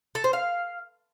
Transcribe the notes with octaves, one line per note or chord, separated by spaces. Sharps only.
A4
C5
F5